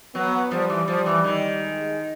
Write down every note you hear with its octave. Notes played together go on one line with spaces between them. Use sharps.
F#3 B3
F3 G3
E3
F3
E3
D#3
G#3